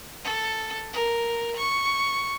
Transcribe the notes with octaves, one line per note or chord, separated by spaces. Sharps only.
A4
A#4
C#6